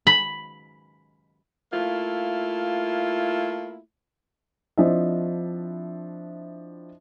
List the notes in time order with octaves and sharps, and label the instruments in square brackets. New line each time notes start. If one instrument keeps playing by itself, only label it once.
[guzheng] B5
[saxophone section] A3 A#3 E4 F4
[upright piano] F3 C4 D4 E4 D#5 E5